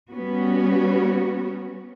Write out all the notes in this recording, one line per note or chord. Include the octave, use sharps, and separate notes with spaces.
G3 B3 C#4 F#4